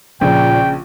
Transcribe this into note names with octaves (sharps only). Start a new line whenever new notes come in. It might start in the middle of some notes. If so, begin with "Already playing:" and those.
A#1 A#2 C#3 G5